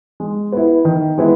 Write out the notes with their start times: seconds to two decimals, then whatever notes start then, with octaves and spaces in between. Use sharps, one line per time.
0.20 G#3
0.52 B3 E4
0.85 D#3
1.18 G#3 B3 E4